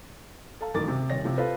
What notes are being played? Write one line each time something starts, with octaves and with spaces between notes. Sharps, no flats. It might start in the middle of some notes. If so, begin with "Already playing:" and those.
A4 F5 A5
E1 F#2 A2 D#3 D6 A6
C3
D#1 C#5 A#6
C3 F3
F4 A4 B4 C5 F5